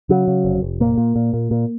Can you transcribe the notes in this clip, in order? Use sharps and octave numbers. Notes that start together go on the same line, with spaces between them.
C#3 F#3
C#3
F1
F1
A#2 A#3
A#2
A#2
A#2
A#2